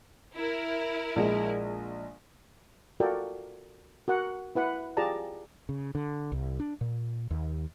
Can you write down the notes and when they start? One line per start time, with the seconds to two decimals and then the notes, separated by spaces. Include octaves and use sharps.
0.34 E4 A#4
1.16 A#1 G#3
3.00 F4 F#4 A4 A#4 D5 G5
4.08 F#4 A#4 F#5
4.55 E4 B4 F#5 B5
4.97 F4 G4 G#4 D5 A5 A#5
5.69 C#3
5.95 D3
6.32 C2
6.60 D4
6.81 A#2
7.31 D#2